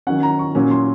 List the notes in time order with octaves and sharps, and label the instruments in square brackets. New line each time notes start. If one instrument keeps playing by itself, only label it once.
[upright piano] D#3 F#3 C#4 F#5
A#5
C#6
A#2 F#3 C#4
C6